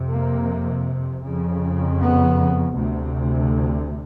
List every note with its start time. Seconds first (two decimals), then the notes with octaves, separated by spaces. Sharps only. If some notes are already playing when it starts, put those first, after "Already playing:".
Already playing: F2 C3
0.13 A#3
1.26 F2 C#3
2.00 B3
2.76 D2 C3